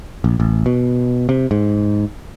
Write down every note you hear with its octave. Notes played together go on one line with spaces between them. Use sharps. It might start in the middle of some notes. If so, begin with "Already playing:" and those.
A#1
A1
B2
C3
G#2